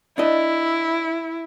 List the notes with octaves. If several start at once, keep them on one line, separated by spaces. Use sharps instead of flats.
D4 E4 D#5